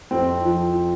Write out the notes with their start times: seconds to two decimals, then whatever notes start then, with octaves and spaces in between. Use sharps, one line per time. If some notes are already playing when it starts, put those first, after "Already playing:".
0.11 F2 C4
0.45 F3